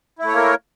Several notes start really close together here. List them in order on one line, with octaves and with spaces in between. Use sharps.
E4 A3 C#5 A#3 A#4